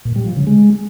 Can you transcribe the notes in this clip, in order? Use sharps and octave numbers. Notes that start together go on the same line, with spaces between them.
A#2
G3
F3
C#3
G#3